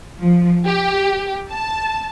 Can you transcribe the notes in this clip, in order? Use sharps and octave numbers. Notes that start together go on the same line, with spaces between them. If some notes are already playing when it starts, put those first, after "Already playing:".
F3
G4
A5